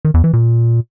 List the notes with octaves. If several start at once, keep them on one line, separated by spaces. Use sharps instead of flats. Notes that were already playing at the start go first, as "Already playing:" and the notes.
D#3
E2
E3
A#2